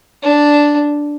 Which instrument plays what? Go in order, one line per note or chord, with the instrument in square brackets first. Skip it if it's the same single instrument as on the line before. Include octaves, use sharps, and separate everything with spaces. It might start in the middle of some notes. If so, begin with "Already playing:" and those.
[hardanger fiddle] D4